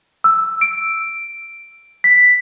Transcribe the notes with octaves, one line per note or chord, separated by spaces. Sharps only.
E6
D7
B6